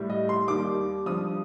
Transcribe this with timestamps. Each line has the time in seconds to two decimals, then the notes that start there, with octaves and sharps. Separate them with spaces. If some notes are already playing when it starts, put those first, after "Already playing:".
Already playing: A2 G3
0.10 D#5
0.29 C6
0.48 D#2 D#3 G3 D6
1.06 G2 F3 D#6